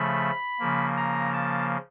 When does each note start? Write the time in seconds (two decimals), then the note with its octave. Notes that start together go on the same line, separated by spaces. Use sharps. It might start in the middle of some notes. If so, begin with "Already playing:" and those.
Already playing: C#3 F3 A3 B5
0.59 C#3 F3 A#3
0.97 A#5
1.33 A5